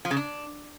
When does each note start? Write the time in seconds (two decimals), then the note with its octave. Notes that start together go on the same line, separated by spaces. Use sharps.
0.05 F3
0.11 C#3
0.17 D4